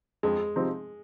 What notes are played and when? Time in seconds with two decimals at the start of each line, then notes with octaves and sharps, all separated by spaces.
0.23 F2 G#3
0.56 C3 F3 C4 D#4